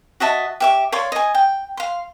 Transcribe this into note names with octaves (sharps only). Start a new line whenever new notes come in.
F#4 D#5 E5 A5
G4 E5 D6
C#5 D5 F5 C6
D#5 G#5
G5
F5 C6